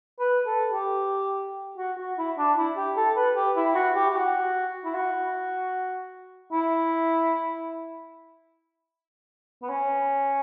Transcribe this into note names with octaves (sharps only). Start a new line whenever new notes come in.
B4
A4
G4
F#4
F#4
E4
D4
E4
G4
A4
B4
G4
E4
F#4
G4
G4
F#4
E4
F#4
E4
B3
C#4